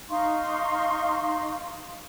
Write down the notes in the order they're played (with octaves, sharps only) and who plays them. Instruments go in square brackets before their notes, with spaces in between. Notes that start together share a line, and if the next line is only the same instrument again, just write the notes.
[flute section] D#4 F5 C6 C#6